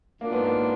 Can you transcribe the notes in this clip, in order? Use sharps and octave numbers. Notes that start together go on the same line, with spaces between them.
G#2 F#3 A#3 D4 F4
B3
A#3